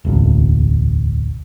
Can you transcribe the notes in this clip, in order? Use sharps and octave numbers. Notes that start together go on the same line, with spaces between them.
E1 A1 D2